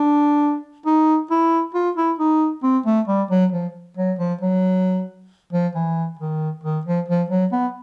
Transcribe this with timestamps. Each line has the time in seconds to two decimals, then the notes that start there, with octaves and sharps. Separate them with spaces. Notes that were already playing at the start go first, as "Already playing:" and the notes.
Already playing: D4
0.86 D#4
1.31 E4
1.74 F4
1.97 E4
2.19 D#4
2.63 C4
2.86 A3
3.08 G3
3.30 F#3
3.52 F3
3.97 F#3
4.19 F3
4.41 F#3
5.53 F3
5.75 E3
6.19 D#3
6.64 D#3
6.85 F3
7.08 F3
7.30 F#3
7.52 B3